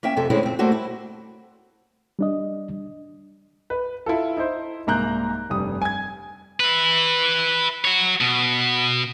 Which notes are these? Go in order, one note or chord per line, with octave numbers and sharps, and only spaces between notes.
A#3 C#4 E5 G5
F2 C3 A4
D3 G#3 A3 C4 C#4 E4
F2 C4
G3 A3 A#3 F#4 C5
E4
G3 D4 D#5
B4
E4 F4 A4
D#4 E4 C5
C2 G#2 A#3 A#5 F#6 G6
F1 G2 G3 D#6
G#5 G#6
E4 B4
F#4 C#5
B2